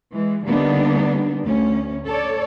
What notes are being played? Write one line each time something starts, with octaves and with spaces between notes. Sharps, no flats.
E3 G#3
D3 G3 A#3 B3 D4 D#4
D2 A3 C#4
A4 C#5 D5